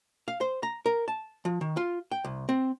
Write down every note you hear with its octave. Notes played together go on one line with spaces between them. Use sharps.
F5
C5
A#5
A#4
A5
F3
D#3
F4
G5
C2
C4